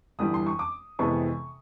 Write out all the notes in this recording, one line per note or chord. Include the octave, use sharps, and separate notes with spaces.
G1 G2 E3 G3 D#6
C6
C#6
D6
F2 C3 E3 G#3 B3 C#6